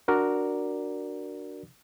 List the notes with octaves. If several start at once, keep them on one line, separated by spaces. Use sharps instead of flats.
D4 F#4 A#4 D5